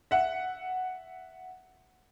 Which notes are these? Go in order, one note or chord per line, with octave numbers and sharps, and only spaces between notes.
E5 F#5